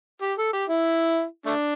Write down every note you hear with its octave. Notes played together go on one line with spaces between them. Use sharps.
G4
A4
G4
E4
A3 D4